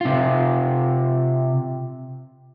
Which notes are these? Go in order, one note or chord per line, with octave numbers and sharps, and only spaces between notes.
C3 F4